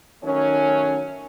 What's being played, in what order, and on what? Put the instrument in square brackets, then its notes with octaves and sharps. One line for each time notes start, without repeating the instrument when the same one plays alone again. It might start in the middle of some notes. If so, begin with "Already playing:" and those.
[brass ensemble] D#3 F#3 A3 C#4